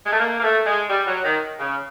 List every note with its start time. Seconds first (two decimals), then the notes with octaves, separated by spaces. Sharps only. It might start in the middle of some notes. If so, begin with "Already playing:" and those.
0.06 G#3
0.12 A3
0.20 A#3
0.40 A#3
0.43 A3
0.66 G#3
0.90 G3
1.07 F#3
1.24 D#3
1.59 C#3